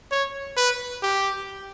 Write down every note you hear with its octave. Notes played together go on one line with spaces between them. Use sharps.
C#5
B4
G4